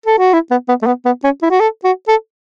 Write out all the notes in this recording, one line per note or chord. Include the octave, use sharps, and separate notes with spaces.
A4
F#4
E4
B3
B3
A3
B3
B3
C#4
E4
F#4
A4
F#4
A4